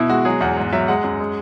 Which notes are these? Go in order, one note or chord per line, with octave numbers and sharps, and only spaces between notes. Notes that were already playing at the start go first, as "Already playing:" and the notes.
Already playing: B2 E4
G#3 F#4
F#3 G#4
E2 F#5
G#2
F#3 E5
G#3 F#5
F#2
G#3